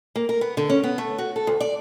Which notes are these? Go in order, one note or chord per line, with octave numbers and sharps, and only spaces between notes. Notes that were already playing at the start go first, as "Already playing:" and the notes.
A#3
A#4
B3
D3
C#4
B3
A3
F#4
A4
D2
D5